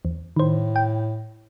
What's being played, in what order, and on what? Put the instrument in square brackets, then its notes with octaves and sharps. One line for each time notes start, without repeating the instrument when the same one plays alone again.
[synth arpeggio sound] E2
[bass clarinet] A2 [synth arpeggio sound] D#3 C5
[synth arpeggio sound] G5